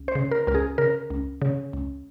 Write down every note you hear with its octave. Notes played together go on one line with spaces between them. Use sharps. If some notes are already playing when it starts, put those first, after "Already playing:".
Already playing: C#2
C5
C#3
A#4
C#2 A#4
G#4
C#3 A#4
C#2
C#3
C#2